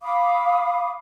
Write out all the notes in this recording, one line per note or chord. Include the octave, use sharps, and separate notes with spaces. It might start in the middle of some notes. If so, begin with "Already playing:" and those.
F5 B5 D6 D#6